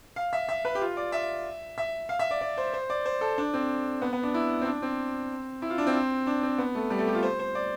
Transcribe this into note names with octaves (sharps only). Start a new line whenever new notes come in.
F5
E5
E5
B4
G4
F4
D5
E5
E5
F5
E5
D5
D5
C5
C5
D5
C5
A4
D4
C4
B3
B3
D4
E4
C4
D4
C4
E4
F4
D4
C4
D4
C4
B3
A3
G3
A3
G4
F4
C5
C5
D5